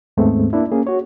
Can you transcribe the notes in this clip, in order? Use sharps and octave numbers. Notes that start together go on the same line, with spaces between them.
D#2 G#2 G#3 A3 B3 C4
A#3 D4 E4
A#3 C#4 G#4
F#4 C#5